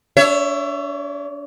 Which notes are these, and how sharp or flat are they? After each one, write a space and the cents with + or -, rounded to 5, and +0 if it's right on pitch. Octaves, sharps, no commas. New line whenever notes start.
D4 -35 C#5 +5 E5 +20